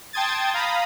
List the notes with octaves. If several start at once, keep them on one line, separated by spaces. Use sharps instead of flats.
G5 A5 C6 D#6 G#6 A6
F5 A#5 B5 D#6